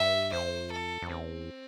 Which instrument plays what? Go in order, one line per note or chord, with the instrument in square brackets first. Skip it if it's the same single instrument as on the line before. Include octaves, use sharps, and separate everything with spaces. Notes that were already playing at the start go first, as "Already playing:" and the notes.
Already playing: [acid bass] G2 [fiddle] E5
[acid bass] F2 [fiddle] C5
[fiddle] A4
[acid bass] F2
[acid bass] E2 [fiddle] C4